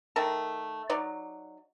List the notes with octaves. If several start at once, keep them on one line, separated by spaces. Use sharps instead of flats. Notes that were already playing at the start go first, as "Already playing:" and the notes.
D#3 A3 A#4 A5
F#3 D#4 D5